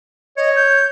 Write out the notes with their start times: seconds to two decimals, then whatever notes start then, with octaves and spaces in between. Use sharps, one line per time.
0.37 C#5 D#5
0.56 G6